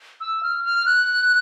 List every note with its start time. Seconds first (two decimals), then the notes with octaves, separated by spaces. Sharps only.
0.20 E6
0.43 F6
0.64 F6
0.86 F#6